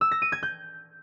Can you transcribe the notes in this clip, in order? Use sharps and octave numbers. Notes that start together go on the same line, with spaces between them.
E6
A#6
D#7
G#6
G6